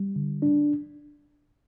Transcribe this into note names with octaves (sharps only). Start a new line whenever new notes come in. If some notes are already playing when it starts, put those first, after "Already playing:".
Already playing: G3
D3
D4